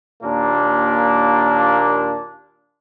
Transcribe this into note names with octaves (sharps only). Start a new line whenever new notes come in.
D#2 A#2 A#3 D4